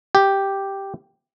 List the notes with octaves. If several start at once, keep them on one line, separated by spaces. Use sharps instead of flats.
G4